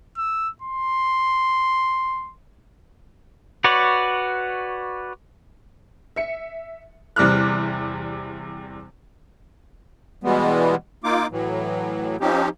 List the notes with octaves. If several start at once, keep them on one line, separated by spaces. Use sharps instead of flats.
E6
C6
F#4 B4 C#5 D5
E5 C#7
E2 C3 G3 D6 F6 F#6
B2 E3 G3 G#3 B3
A#3 D#4 F4 D6
A2 E3 F#3
F3 C4 C#4 D#4 G4